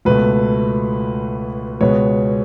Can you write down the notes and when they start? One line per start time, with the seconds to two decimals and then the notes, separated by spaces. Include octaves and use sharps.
0.05 C#2 B2 A3 B4
1.81 C#2 B2 G#3 B3 C#5